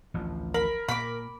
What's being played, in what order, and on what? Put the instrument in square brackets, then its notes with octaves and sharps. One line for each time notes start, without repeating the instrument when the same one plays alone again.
[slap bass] A1 D2 F3
[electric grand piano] A#4 [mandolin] B5
[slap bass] A#2 [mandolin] B5 D6